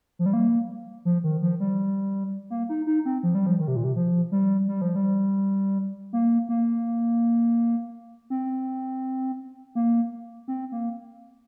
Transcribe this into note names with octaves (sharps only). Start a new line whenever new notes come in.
F3
G3
A#3
F3
D#3
F3
G3
A#3
D#4
D#4
C4
F3
G3
F3
D#3
C3
A#2
C3
F3
G3
G3
F3
G3
A#3
A#3
C4
A#3
C4
A#3